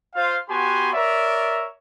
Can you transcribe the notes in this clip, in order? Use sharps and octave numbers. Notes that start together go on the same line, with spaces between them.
F4 C5 F5
B3 F#4 G4 G#5 C6
A#4 C#5 D5 E5